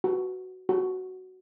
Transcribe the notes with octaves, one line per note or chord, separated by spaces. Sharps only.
F#4
F#4